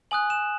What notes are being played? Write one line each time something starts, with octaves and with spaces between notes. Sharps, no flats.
G#5 D#6 F#6 F#7
E7